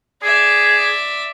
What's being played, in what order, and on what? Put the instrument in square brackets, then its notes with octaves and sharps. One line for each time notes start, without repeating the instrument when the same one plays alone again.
[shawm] G#4 [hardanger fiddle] D5 E5